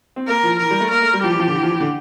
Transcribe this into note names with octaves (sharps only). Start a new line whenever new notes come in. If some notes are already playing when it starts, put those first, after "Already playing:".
C4
A#3 A#4
F3
E3 A#4
G3
A3
A#3 A#4
A3
G3
F3 G4
E3
F3
D3
E3
F3
E3
D3